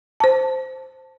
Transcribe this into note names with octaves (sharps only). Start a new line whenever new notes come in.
C5 A5